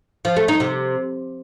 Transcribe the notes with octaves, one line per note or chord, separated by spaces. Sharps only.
F3
A3
D#4
C3